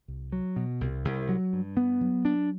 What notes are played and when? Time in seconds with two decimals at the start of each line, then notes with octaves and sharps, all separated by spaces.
0.08 C2
0.32 F#3
0.56 B2
0.81 C2
1.05 C2
1.29 F#3
1.53 G2
1.77 B3
2.01 F#3
2.25 D4